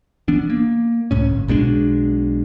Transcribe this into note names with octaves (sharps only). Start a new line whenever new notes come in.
E3 B3 D4
A#3
C2 A2 C#4
G1
B1 B2 G#3 D4